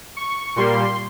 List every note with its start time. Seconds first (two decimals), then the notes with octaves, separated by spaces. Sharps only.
0.17 C#6
0.56 A#2 G3 A#3 C6